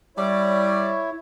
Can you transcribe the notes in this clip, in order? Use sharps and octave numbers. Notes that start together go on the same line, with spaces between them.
G3 E4 C#5 D5 E5